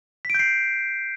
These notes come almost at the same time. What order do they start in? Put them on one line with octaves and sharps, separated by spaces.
B6 D7 G6 C7